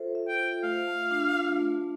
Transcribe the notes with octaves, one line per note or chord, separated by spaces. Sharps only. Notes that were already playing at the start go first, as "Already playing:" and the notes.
Already playing: F4 A4 C5 E5
E5
G5
F4
A3 F5
A3
D4
F4
A3